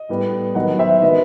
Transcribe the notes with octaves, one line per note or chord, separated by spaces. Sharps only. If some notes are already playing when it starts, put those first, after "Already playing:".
Already playing: D#5
A2 G3 B3
D#3 F#3 B3 D#5 F#5
C5 E5
D#3 F#3 B3 B4 D#5